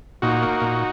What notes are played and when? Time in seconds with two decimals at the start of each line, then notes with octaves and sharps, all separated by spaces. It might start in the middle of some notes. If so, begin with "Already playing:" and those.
0.22 A#2 D#4 F#4
0.42 A#3
0.61 A#2